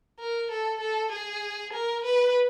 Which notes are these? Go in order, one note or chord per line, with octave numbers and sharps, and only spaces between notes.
A#4
A4
A4
G#4
A#4
B4